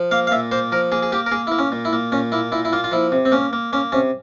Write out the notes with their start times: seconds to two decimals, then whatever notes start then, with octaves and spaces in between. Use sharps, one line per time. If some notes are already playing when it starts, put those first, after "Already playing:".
Already playing: F3
0.11 A#3 F5
0.27 F5
0.31 A#2 E5
0.51 A#3 C5
0.72 F3 A#4
0.92 A#3 G#4
1.03 G#4
1.12 A#3 G4
1.26 A#4
1.31 A#3 G#4
1.47 A#3 E4
1.59 C#4
1.72 A#2
1.85 E4
1.93 A#3
2.12 A#2 C#4
2.32 A#3 E4
2.52 A#2 E4
2.65 E4
2.73 A#3 F4
2.84 F4
2.92 F3 E4
3.12 C3
3.25 C4
3.32 A#3 C#4
3.53 A#3
3.73 A#3 C#4
3.92 C3 C#4